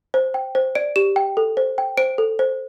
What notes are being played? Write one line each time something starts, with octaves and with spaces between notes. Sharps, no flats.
C5
G5
C5
D5 D7
G4 E7
G5
A4
C5
G5
C5 D7
A4
C5